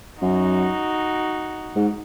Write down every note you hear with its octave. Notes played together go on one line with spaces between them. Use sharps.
F#2 D#4 F#4
G#2